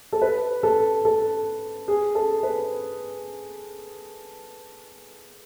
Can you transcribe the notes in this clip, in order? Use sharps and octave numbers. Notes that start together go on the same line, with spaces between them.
A4
B4
A4
A4
G#4
A4
B4